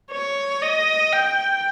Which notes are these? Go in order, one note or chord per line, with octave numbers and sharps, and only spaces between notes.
C#5
D#5
G5